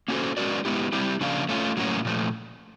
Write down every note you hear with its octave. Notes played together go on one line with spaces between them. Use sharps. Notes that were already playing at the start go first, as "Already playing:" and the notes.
A#3 C#4 F#4 A4 C5
G#3 C#4 F#4 A#4 D5
G#3 B3 E4 G4
G3 C4 E4 G4
C#3 F3 A#3 D4 F4
A3 C#4 F4
A2 F#3 A#3 C#4 F#4
A#2 F3 A3